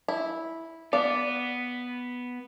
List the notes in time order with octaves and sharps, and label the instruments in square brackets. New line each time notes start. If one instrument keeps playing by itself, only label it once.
[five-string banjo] E4
[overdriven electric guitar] B3 [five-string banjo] D5 F5